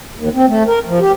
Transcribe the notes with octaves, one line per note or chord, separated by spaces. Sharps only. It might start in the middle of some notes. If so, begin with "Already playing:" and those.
D#2
C4
A3
A#4
F3
G4